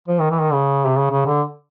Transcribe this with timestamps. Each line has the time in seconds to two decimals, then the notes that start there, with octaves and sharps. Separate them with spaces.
0.08 F3
0.19 D#3
0.31 E3
0.41 D#3
0.52 C#3
0.85 C3
0.97 C#3
1.11 C#3
1.26 D3